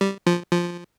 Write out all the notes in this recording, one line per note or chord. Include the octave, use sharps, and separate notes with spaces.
G3
F3
F3